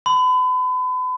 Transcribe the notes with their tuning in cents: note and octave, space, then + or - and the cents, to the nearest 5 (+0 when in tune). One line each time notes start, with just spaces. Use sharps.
B5 +35